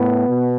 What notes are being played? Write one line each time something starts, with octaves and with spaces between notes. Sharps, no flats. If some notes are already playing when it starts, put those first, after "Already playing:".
Already playing: A2 B3
B2